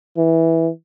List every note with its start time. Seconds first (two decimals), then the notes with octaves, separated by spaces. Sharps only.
0.17 E3